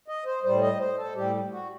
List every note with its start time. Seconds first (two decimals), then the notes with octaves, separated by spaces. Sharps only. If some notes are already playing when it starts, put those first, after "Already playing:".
0.08 D#5
0.26 C5
0.43 A2 G3 C5
0.62 D#5
0.80 C5
0.97 A4
1.15 A2 G3 G4
1.52 F#4